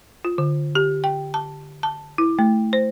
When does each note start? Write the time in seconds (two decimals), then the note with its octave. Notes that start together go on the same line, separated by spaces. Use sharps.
0.25 F4
0.38 D3
0.75 G4
1.04 G5
1.34 A5
1.83 A5
2.18 E4
2.39 A3
2.73 C5